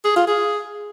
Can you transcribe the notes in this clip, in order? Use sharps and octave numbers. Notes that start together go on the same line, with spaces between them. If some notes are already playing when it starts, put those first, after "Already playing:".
G#4
F4
G#4